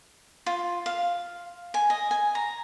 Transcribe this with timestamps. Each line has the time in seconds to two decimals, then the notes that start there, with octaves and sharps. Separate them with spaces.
0.46 F4
0.86 F5
1.74 G#5
1.90 D#5
2.11 G#5
2.35 A#5